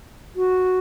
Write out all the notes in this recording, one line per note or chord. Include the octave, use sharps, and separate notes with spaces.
F#4